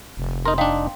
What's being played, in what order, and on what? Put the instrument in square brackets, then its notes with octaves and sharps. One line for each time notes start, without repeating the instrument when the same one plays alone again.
[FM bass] F1
[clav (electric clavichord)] D#4 A#4 [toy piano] C6
[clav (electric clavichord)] D4 D#4 [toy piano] F5 G5